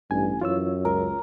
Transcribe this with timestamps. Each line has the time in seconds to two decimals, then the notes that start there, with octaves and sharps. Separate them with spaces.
0.11 A1 G2 G#5
0.41 F#2 E3 F4 C#5 E6
0.85 C#2 A#4